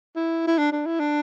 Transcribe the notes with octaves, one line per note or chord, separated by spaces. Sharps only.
E4
E4
D4
D4
E4
D4